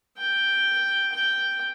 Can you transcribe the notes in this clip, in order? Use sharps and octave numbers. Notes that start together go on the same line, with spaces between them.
G5
G5